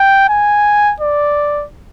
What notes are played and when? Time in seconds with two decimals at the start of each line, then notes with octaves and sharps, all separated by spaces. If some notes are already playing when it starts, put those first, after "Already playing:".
Already playing: G5
0.29 G#5
1.01 D5